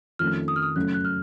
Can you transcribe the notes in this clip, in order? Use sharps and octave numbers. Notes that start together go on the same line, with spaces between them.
F2 D#3 A3 C#4 F6
D#6
F6
D#6
F#2 C#3 A3 F#6
F#6
F6